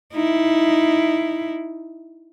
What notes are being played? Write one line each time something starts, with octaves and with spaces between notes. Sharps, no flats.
D#4 E4